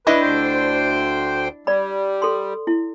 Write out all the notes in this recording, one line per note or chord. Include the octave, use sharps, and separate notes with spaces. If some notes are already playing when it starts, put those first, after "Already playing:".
D4 E4 B4 D#5 C#6
D2 C5 G5
G3 D5 B5
A4 C6
E4